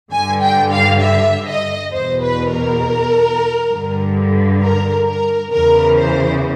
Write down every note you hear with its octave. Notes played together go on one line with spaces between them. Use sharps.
G2 D3 G#5
G5
F5
E5
D#5
E2 B2 C5
B4
A#4
G2 D3
A#4
A#4
E2 C#3 E3 A#4
C5